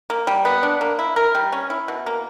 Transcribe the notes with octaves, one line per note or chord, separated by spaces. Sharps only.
A#3
G3
B3
D4
A#3
E4
A#4
G3
C#4
E4
B2
A#3